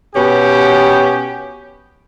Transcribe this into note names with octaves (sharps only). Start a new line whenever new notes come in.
B2 B3 C#4 G4